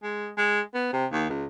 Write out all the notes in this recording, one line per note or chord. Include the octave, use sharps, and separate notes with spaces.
G#3
G#3
B3
C3
D#2
C#2